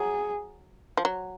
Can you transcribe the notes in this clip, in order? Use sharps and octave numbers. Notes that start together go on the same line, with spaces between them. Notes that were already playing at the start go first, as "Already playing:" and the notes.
Already playing: F#3 G#4
F3
F#3